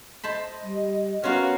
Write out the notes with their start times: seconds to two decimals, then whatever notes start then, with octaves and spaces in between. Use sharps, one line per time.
0.23 C5 D#5 A5 B5
0.63 G3
1.24 B3 C#4 F4 F#4 A#4 F5